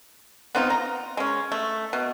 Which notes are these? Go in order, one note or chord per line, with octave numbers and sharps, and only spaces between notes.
B3 C4 D#4 F4
A#5
G#3 C#4
A3
B2